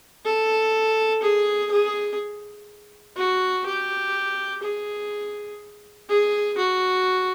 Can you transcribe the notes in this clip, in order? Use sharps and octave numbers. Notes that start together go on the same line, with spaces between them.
A4
G#4
G#4
F#4
G4
G#4
G#4
F#4